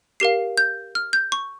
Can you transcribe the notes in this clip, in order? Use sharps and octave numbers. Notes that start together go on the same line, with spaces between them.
G4 A#4 F5 C7
G6
F6
G6
C#6